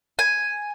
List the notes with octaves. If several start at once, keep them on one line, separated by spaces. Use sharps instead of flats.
G#5